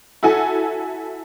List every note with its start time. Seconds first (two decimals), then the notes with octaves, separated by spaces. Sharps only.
0.23 E4 F#4 A4 G#5